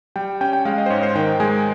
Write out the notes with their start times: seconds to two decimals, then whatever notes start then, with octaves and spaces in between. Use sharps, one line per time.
0.16 G3 G5
0.41 C#4 G5
0.53 G5
0.65 G#3 F5
0.78 D#5
0.86 C5
0.90 G#2 C#5
1.03 C5
1.15 D#3 G5
1.40 G#3 G#5